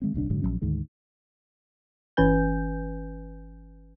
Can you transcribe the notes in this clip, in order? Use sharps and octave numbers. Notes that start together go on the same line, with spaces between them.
D#3 G#3 C4
D#1 C2 C#4 D4
F#1 G#2 D3 F#3
A#1 F#2 F#3 C#4
D2 G#2 D#3 G#3
G1 E3 C#4 B4 G#5 G6